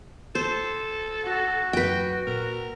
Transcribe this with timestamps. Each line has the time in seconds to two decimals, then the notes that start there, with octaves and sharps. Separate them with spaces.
0.35 A4 C5
1.24 F#4
1.73 F#2 B4 G5
2.27 A#2 A#4